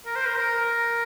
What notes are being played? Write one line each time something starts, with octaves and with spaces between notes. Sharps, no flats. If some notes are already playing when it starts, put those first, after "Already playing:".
A#4
C5
A#4
A#4